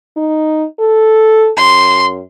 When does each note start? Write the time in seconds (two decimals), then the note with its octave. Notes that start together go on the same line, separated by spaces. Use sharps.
0.17 D#4
0.79 A4
1.57 F#2 C6